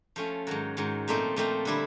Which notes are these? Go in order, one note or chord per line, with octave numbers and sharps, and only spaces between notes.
F3 A3 C#4
G#2 D#3 F#3
G#2 D#3 F#3
A#2 F3 A3 C4 D#4
A#2 F3 A3 C4 D#4
D3 G3 C4 E4